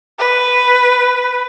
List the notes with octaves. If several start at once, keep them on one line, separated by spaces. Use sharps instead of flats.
B4